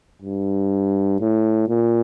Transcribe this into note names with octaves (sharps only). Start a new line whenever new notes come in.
G2
A2
A#2